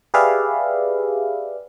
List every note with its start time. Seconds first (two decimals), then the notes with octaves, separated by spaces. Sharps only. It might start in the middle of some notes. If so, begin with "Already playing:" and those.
0.14 G4 G#4 B4 D5 E5 F5